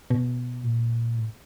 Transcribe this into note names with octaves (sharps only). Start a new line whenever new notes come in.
B2
A#2
A2